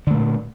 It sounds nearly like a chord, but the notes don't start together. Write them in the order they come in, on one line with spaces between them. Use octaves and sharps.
D3 A3 A#2